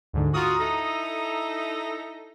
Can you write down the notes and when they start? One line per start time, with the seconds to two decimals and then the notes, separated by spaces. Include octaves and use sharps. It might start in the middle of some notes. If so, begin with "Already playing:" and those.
0.13 D2 G#2 D3
0.34 F4 F#4 A#5 D#6
0.60 D#4 E4 A4